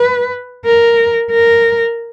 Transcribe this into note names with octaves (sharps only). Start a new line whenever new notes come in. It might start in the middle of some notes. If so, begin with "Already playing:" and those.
Already playing: B4
A#4
A#4